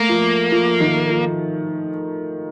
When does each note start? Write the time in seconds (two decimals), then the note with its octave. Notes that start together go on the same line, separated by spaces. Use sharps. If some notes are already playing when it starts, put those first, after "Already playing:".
Already playing: A3 A#3
0.09 F3
0.52 F3
0.80 D#3
1.09 F3